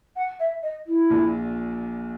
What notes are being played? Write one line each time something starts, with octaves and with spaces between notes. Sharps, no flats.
F#5
E5
D#5
E4
A#1 A#2